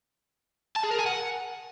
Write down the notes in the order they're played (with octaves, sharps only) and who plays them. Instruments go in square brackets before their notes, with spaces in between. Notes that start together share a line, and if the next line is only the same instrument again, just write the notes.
[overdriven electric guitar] A5
G#4
A#4
G#5
F#5